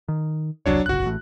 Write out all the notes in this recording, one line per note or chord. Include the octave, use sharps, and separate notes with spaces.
D#3
E1 C2 F#3 D4 C#5
D1 G1 C#2 F#4 F#6
A1 A2